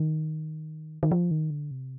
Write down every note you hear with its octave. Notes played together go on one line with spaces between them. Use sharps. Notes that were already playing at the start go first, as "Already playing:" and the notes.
Already playing: D#3
D#3
F3
D#3
D3
C3